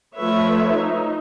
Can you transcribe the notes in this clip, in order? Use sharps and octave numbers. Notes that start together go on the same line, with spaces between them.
F3 A3 B4 C#5 E5
D#4